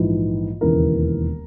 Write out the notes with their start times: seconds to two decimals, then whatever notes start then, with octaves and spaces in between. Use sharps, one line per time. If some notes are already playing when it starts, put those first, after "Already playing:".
Already playing: A#1 G#2 E3
0.61 E1 D#2 C#3 E3 A#4